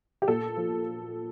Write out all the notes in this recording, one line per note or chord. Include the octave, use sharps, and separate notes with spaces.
G4
A#2 A4
F3